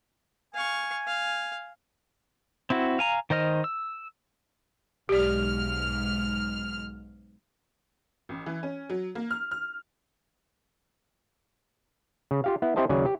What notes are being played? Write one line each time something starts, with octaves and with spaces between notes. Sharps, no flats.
F5 G#5 C#6
F5
C4 E4 F#4
F5 G#5 A#5
D#3 C5 D#5 F6
E6
B1 G#2 G4 D5 F6
A1
E3
C#4
F#3
A#3
F6
F6
C#3
F4 G4 F5
B3 E4
C4 E4 G4 C5 D#5 A5
D#2 C#3 F#3 D5 G#5
G4